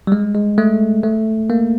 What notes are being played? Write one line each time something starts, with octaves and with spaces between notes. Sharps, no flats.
G3
G#3
G#3
A3
A3
A#3